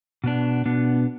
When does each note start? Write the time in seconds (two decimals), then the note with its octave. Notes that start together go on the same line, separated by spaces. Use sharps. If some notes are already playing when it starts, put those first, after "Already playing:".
0.24 B2 B3 D4
0.65 B2 B3 D4